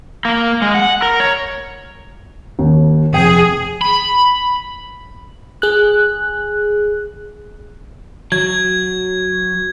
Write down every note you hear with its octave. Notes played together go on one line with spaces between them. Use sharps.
A#3
G#3
F#5
A#4
C#5
D#2
F1 G#4 G5
B5
G#4 F#6
F#3 G#6